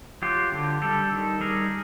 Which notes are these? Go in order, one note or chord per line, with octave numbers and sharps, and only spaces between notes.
F#3 F4 G4
D3
G3 G4 A4
D#3
G3 G#4 A#4